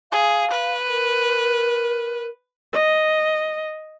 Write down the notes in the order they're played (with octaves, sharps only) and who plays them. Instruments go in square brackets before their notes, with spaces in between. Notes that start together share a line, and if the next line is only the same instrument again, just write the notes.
[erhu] G#4 [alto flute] F5
[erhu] B4
[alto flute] A#4
[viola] D#5